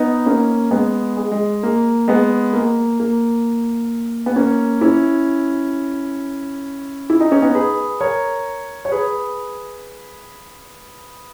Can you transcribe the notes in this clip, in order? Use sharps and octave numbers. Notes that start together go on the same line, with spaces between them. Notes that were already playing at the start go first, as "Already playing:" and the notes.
Already playing: B3 D#4
A#3 C#4
G#3 B3
G#3
G#3
A#3
G#3 B3
A#3
A#3
B3
A#3 C#4
C#4 E4
E4
D#4
C#4
B3 D#4
G#4 B4
A#4 C#5
C#5
G#4 B4